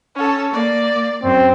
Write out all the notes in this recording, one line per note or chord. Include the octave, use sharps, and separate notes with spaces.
C#4 A4
A#3 D5
F#2 C4